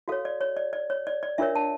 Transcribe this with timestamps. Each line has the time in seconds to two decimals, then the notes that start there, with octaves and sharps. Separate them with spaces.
0.08 F#4 A4 C#5 F5
0.25 D5
0.41 C#5
0.57 D5
0.73 D5
0.90 C#5
1.07 D5
1.23 D5
1.38 D4 F4 A#4 C#5 E5
1.55 A5